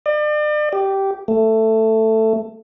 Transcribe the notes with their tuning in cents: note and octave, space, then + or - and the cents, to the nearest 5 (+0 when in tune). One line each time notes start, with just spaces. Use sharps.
D5 +40
G4 -10
A3 +10